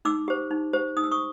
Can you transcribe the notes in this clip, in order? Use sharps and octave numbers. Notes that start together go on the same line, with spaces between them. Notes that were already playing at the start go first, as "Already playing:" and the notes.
D#4 D6 E6
G4 C5
D#4
G4 C5
D#4 D#6
E6
C#6 D#6